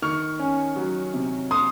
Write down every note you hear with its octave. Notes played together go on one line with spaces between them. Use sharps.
D#3 C#6 F6
C#4
F#3
C3
C6 D#6